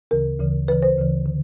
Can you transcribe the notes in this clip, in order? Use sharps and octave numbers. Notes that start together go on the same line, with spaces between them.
D2 C#3 E3 A#4
D2 C#3 E3
D2 C#3 E3 B4
C5
D2 C#3 E3
D3